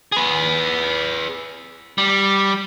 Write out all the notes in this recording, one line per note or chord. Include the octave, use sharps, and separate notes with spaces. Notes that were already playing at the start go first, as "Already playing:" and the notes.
G#4 B4
G3